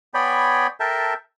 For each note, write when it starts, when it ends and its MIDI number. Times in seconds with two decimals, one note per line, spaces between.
0.14 0.67 59
0.14 0.67 73
0.14 0.67 74
0.14 0.67 79
0.14 0.67 80
0.14 0.67 83
0.80 1.14 69
0.80 1.14 70
0.80 1.14 76
0.80 1.14 79
0.80 1.14 81